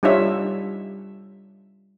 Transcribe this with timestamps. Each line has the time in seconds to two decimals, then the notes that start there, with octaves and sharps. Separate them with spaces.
0.03 G3 D4 D#4 F4 C#5 E5